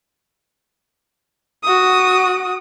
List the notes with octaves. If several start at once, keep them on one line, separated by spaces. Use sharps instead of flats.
F#4 D#6